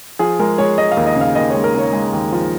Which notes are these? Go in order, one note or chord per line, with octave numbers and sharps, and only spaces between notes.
F3 G#4
G#3 A#4
G#3 C#5
G#3 D#5
F5
D#2
D#5
C#3
F5
D#2 D#5
G#3 C#5
A#4
C#3 C#5
G#3
D#2
F3